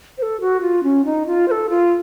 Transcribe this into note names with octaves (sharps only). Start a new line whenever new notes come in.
C5
A4
F#4
F4
C#4
D#4
F4
C5
A4
F4